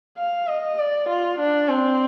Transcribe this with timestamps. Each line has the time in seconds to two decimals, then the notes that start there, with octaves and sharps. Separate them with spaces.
0.18 F5
0.48 D#5
0.79 D5
1.09 F4
1.40 D4
1.69 C4